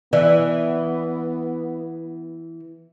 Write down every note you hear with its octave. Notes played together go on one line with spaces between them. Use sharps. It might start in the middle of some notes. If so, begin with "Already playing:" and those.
E3 B3 D5